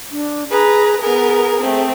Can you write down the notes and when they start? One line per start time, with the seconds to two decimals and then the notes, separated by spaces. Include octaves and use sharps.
0.11 D4
0.50 G#4 B4 A#5
1.00 B3 G#4 A#4
1.60 A3 C4